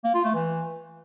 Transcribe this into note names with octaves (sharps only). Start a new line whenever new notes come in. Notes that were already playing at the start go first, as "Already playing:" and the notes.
A#3
F4
A3
E3